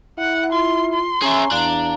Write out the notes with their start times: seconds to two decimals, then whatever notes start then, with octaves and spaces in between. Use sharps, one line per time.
0.19 E4 F#5
0.52 F4 C6
0.93 C6
1.22 C#4 G#4 E5 G#5 A#5 C#6
1.52 E2 D4 F5 A#5